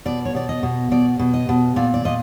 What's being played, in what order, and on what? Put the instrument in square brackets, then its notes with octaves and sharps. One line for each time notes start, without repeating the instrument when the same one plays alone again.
[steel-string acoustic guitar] B2 D5
C#5
B2 D5
D#5
B2
B2 D5
B2
D#5
B2
A#2 D5
D5
A#2 D#5